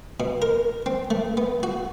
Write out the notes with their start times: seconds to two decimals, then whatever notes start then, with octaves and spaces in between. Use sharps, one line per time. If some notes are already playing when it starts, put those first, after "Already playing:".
0.20 B2
0.42 A#4
0.86 C4
1.11 A3
1.37 B3
1.63 F#4